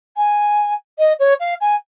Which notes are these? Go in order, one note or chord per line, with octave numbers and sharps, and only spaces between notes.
G#5
D#5
C#5
F5
G#5